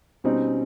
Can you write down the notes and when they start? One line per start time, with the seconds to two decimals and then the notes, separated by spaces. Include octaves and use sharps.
0.24 B2 G3 C4 C#4 D#4